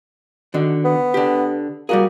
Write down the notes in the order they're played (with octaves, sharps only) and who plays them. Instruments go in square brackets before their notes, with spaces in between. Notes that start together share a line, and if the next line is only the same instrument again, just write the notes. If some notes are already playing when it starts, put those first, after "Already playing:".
[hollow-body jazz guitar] D3 D#3 F#4
[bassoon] B3
[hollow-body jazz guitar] D3 G4
[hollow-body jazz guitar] G3 F#4 G#4 [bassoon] A#3